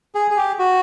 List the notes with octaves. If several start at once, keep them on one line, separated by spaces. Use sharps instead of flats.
G#4
G#4
G4
F#4